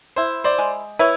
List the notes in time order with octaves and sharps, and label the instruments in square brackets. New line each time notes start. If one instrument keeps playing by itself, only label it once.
[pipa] E4 [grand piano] C5
[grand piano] C5 D5
[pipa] G#3
[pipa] E4 [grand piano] B4 C#5